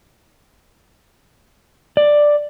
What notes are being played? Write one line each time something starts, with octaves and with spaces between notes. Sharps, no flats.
D5